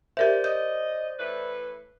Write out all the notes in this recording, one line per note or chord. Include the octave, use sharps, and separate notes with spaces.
G4 A#4 C5 D5 E5
D#5 G6
A2 E3 B4